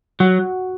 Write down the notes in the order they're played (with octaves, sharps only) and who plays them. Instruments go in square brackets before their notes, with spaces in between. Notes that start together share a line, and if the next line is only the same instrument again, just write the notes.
[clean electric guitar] F#3 [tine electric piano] F#4 F#5